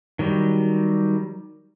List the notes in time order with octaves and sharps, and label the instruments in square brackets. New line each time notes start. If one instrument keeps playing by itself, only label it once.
[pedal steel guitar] D#3 F#3 G3